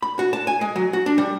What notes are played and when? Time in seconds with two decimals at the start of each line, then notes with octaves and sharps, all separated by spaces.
0.02 B5
0.19 F#4
0.33 A5
0.47 G#5
0.61 G#3
0.76 F#3
0.93 F#4
1.06 D4
1.18 G3